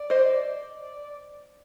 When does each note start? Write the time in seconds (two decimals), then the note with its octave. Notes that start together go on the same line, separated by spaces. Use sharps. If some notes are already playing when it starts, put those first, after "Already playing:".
Already playing: D5
0.10 C5 D#5
0.35 D5